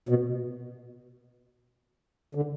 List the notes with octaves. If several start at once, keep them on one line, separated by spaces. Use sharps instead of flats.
B2
D3